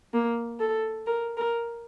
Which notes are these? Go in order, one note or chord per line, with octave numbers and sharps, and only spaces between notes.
A#3
A4
A#4
A#4